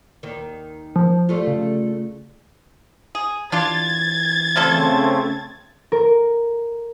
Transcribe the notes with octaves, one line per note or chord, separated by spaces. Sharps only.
D#2 D#3
F3
G3 A3 F4
C#3
G#4
E3 D4 F4 G4 G#6 A6
C#3 F3 G3 A3 C4 A4
A#4